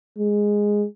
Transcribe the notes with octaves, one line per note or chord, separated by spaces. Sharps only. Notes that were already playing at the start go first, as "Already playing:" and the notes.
G#3